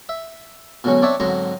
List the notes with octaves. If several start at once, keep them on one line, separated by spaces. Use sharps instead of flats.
E5
B2 D3 F#3 G#3 C#4
C4 D4 C#5 D5 E5
G#2 D3 F#3 C4 A#5 C6